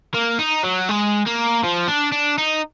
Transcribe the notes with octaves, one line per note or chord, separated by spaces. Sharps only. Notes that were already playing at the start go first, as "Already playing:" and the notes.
A#3
D#4
F#3
G#3
A#3
F3
D4
D4
D#4